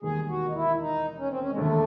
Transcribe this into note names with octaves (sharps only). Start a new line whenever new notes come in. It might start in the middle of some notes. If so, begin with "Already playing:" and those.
E1 D#2 D#3 G3 G#4
F#4
D#4
E4
D#4
C#4
C4
C#4
G#3
E1 D#2 D3 A3